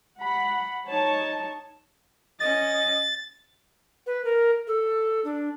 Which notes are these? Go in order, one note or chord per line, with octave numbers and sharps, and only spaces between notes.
F#5 B5
D#4 C#5 A5
C#4 D#5 A6
B4
A#4
A4
D4